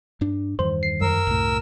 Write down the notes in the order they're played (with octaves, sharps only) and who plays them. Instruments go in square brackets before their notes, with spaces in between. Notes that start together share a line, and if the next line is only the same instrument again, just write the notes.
[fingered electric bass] G2 D4
[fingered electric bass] E2 G2 D#3 [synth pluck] C5
[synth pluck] C7
[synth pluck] F#2 [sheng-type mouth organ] A#4 E6
[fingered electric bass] C2 A2